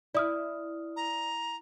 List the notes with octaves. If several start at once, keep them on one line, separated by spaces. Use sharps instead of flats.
E4 D5 D#6 F6
A#5